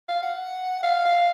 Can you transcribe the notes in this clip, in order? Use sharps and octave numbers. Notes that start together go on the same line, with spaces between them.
F5
F#5
F5
F5